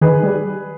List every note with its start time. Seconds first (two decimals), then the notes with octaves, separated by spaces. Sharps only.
0.01 D#3 G#4 B4
0.23 G3